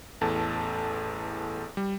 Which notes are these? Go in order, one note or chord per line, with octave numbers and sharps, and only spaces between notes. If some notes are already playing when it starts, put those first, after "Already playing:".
A1 E2 A4 A5
G3